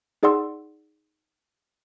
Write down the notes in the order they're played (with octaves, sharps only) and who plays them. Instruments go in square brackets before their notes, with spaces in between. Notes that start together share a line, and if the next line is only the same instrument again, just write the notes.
[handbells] D#4 G#4 D5 F#5 C6 E6